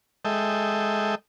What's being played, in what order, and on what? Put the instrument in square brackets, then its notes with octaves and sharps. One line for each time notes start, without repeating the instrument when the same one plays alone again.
[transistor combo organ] G#3 A4 D#5 E5 G5